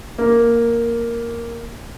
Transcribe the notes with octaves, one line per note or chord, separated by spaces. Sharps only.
A#3